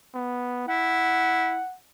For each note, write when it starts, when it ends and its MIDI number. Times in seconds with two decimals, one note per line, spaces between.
0.14 0.66 59
0.68 1.61 64
0.68 1.76 78